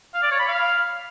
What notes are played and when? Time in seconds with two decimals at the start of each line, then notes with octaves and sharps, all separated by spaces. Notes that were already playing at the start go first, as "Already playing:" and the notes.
0.14 F5
0.23 D5
0.31 C#5
0.39 B5
0.48 F5